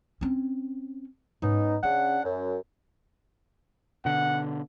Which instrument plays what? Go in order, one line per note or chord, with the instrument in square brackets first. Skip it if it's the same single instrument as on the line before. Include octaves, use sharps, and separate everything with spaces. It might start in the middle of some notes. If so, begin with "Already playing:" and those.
[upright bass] C4 C#4
[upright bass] G#2 [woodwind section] B3 C#4 D#4
[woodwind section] C#3 D4 F#5 [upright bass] C#4
[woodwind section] F#2
[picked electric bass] B2 D3 [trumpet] F#5